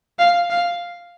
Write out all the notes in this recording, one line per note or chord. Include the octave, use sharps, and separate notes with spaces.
F5
F5